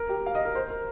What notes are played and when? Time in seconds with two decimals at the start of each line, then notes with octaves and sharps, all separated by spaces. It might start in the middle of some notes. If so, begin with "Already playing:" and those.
Already playing: A#4
0.09 G4
0.26 F5
0.35 D#5
0.45 A#4
0.55 C5
0.70 A#4